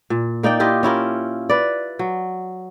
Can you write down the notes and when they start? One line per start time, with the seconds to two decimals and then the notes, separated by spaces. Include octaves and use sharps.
0.10 A#2
0.43 A#3 D#4 D5 G5
0.60 E4 F4 G4 D#5
0.83 C#4 E4 F4 A#4
1.50 B4 D5
1.99 F#3